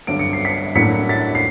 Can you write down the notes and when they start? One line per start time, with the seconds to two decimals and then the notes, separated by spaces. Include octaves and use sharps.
0.07 G2 D3 F#3 D7
0.19 C#7
0.33 C7
0.45 B6 C#7
0.75 A2 F#3 A#3 D4 B6 C#7
1.09 A6 B6
1.35 C7